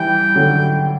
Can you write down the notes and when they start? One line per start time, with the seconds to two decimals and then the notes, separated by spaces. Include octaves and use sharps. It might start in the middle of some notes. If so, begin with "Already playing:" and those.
Already playing: E3 G3 G5
0.36 D3 F#3